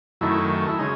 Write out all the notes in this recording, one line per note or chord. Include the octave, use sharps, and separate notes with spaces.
F#2 D#3 A3 E4
E4
C#3 G#3 D#4